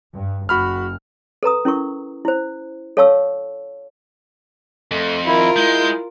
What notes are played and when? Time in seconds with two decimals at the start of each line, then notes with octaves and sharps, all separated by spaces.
0.14 G2
0.49 F#1 F#4 B5 F6
1.43 A4 B4 A#5 D#6
1.65 C#4 E4 A#4 C#6
2.25 E4 C5
2.97 A4 C#5 F5 A5 C#6 E6
4.91 F2 A3
5.26 D#3 E4 F4 A#4
5.56 G#3 E4 G6